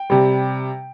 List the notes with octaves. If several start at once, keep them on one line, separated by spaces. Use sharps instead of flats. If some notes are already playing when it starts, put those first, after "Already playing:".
Already playing: G5
C3 G3